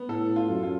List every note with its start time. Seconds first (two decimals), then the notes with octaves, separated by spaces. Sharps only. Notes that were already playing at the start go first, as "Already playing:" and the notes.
Already playing: B3
0.09 A2 A4
0.36 F4
0.49 F#2
0.63 F4